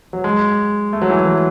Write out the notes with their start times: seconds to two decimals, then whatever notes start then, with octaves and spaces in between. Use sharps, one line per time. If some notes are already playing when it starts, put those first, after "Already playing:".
0.13 F#3
0.24 G#3
0.93 A3
1.02 F#3
1.10 E3
1.26 F#3